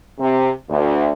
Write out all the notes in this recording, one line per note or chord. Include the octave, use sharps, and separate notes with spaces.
C3
D2